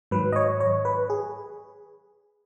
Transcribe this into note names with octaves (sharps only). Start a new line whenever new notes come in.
G#2 D#3 F#3 B4
D#5
C#5
C#5
B4
G#4